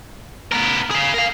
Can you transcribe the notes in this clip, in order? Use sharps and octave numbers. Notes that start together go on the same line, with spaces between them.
B3 A#4
G#4 F5
A#4 F5